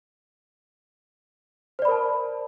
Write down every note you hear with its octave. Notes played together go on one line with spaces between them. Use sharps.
A#4 C5 D5 A5 B5